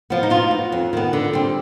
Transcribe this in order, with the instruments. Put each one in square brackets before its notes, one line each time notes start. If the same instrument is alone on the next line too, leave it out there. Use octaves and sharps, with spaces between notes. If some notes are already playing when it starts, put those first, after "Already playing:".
[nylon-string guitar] F3 B3
D#4
B2 F4
B3
F2
D#3 B3
D3
G3 C4